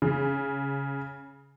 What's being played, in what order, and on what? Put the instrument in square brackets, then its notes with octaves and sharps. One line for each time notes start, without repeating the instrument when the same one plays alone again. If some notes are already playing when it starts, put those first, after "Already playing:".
[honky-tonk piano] C#3